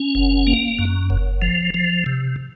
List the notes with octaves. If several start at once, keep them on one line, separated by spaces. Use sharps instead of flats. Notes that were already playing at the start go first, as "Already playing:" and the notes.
Already playing: C#4
F#1
A#3
F#2
F#1
F3
F3
C3